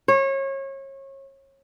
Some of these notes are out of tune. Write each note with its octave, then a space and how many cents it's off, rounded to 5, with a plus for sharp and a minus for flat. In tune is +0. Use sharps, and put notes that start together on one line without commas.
C#5 -30